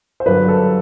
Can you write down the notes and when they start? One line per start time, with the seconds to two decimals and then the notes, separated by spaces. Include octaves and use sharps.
0.20 C5
0.26 G2 D3 F#3 B4
0.48 A4